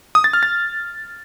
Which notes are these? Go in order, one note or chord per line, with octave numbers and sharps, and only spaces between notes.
D#6
A6
F6
A6